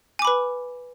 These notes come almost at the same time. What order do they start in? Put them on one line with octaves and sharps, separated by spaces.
G#5 D6 B5 B4